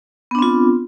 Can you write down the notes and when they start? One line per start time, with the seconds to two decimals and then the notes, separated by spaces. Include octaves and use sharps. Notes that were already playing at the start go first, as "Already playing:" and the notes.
0.31 B3
0.35 D4
0.39 C4
0.42 F4